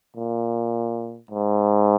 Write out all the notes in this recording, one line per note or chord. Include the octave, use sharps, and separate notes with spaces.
A#2
G#2